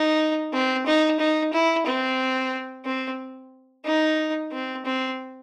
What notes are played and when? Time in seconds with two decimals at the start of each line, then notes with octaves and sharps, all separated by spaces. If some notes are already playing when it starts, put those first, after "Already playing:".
Already playing: D#4
0.53 C4
0.86 D#4
1.20 D#4
1.53 E4
1.86 C4
2.85 C4
3.85 D#4
4.52 C4
4.85 C4